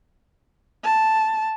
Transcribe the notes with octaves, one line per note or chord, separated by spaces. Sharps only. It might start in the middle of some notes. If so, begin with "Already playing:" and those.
A5